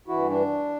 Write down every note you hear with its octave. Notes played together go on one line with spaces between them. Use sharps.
G2 E3 E4 F#4
D4